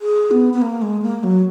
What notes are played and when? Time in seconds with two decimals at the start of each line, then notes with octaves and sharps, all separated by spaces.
0.01 G#4
0.31 B3
0.54 B3
0.62 A#3
0.82 G#3
1.02 A#3
1.24 F#3